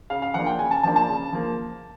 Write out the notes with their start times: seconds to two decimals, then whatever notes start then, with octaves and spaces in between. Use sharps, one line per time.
0.10 C#3 F5
0.22 F5
0.34 F3 A#3 D4 F#5
0.46 G5
0.59 C#3 G#5
0.71 A5
0.83 F3 A#3 D4 A5
0.96 A5
1.08 C#3
1.33 F3 A#3